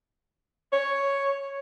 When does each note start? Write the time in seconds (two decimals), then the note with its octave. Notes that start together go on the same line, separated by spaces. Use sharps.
0.73 C#5